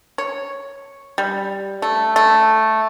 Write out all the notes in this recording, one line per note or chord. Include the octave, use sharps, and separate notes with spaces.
C#5
G3
A3
A3